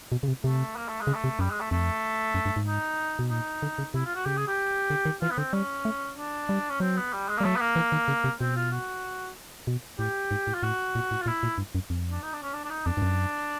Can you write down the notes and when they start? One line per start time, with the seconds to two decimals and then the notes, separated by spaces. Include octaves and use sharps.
0.12 B2
0.23 C#3
0.28 C3
0.44 C3 A3
0.76 A#3
0.88 A3
1.01 G#3
1.07 C#3
1.14 A3
1.24 C3
1.39 F#2 G3
1.50 G#3
1.61 A3
1.71 F2 A3
2.34 F#2
2.45 G2
2.56 G#2
2.67 D#4
3.19 B2
3.30 A#2 D#4
3.62 D3
3.78 C#3
3.94 C3 E4
4.05 F4
4.15 F#4
4.26 C#3 G4
4.37 G#4
4.47 G4
4.90 D3
5.05 D#3
5.21 E3 F4
5.31 B3
5.38 D3 C4
5.53 G3 C#4
5.85 A3
6.17 D4
6.49 G3
6.70 C#4
6.80 F#3 C4
6.96 B3
7.13 G3
7.29 G#3
7.38 A#3
7.41 G3
7.44 F#3 A3
7.56 B3
7.60 A#3
7.76 E3
7.92 D#3
8.08 C#3
8.24 C3
8.41 B2 C4
8.56 F4
8.72 F#4
9.67 B2
9.99 A2 G4
10.31 G#2
10.47 A2
10.54 F4
10.63 A2 F#4
10.95 A#2
11.11 A2
11.21 F4
11.26 A#2 E4
11.43 A#2
11.58 G2
11.75 F#2
11.90 F2
12.11 D4
12.23 D#4
12.33 D4
12.43 C#4
12.53 D4
12.65 D4
12.70 D#4
12.85 F2 D4
12.97 G2
13.02 F#2